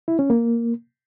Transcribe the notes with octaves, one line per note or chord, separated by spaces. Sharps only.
E4
C#4
A#3